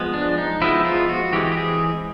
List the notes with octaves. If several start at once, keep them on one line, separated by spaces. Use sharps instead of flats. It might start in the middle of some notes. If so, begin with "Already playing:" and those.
Already playing: F3 G#3 B3
D4
D#4
F3 G#3 B3 E4
F4
F#4
E3 G#3 C4 G4
G4
G#4